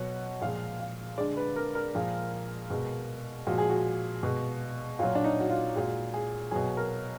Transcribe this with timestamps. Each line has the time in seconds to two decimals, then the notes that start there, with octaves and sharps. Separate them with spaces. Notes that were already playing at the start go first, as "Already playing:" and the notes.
Already playing: B2 F#3 F#5
0.41 A#2 F3 G#3 F5
0.80 F5
1.18 D3 G#3 D5
1.37 B4
1.56 A#4
1.75 A#4
1.94 A#2 F3 G#3
2.70 B2 G#3
3.47 A#2 F3 G#3 F#4
3.58 G#4
3.70 F#4
4.23 B2 G#3
4.99 A#2 F#3 F4
5.15 D4
5.24 D#4
5.40 F#4
5.50 F4
5.75 A#2 G#3 F#4
6.14 G#4
6.51 B2 F#3 G#4
6.77 A#4